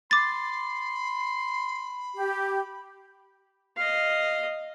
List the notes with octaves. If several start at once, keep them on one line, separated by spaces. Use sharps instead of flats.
B5 C6 D6 A6
G4
D#5 F5